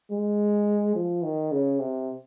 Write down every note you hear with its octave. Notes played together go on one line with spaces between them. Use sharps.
G#3
F3
D#3
C#3
C3